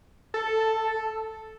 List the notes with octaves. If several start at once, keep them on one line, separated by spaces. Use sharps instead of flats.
A4